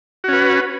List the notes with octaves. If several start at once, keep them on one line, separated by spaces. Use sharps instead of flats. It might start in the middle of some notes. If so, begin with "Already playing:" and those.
C#4 F#4 B4